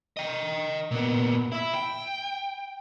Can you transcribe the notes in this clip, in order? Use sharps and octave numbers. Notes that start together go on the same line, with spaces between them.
D#5 G5
A#2 B3
E4 E5
G5